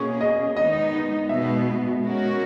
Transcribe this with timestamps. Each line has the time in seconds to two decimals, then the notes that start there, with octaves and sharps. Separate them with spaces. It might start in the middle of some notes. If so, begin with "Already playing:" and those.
Already playing: B2 A#3 C#4 G#4 C#6
0.21 D#5
0.57 D#3 G#3 B3 D#4 D#5
1.29 B2 G#3 B3 E5
2.02 G#3 C#4 F#4 A#4